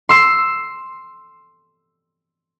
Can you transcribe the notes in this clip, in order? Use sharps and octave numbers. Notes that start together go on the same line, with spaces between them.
C6 E6 C7